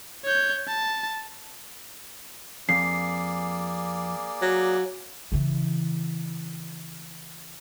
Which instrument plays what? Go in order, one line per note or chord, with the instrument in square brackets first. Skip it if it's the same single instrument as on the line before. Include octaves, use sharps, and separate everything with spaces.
[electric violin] C#5 G6
A5
[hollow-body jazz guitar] F2 [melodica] A#3 G#4 D5 [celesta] C7
[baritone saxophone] F#3
[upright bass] C#3 E3